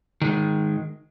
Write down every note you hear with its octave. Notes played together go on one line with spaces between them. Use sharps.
D#3 G#3